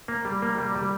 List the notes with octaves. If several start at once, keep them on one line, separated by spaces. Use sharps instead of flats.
A#3
G3
A#3
G3
G3